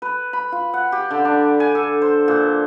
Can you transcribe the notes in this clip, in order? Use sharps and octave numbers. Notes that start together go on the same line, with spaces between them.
B4
B5
F4
F#5
G4
D3
D4
G#5
A4
C5
A#2